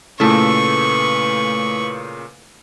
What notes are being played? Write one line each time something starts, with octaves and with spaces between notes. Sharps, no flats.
A#2 C#3 A3 E4 A4 B4 C#6